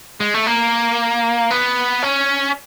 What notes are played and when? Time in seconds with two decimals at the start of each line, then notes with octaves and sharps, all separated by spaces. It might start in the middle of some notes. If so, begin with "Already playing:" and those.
0.20 G#3
0.34 A3
0.46 A#3
1.51 B3
2.03 C#4